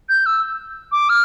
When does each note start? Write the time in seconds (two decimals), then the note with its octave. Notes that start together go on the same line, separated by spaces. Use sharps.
0.09 G6
0.26 E6
0.92 D6
1.09 F6